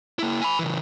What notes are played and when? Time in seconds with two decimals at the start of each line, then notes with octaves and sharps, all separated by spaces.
0.19 A#3 E4
0.41 G#5 B5
0.59 C#3 E3